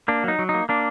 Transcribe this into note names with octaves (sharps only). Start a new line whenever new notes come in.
A#3 D4
F#3 D#4
F#3
D#4
A#3
A#3 D4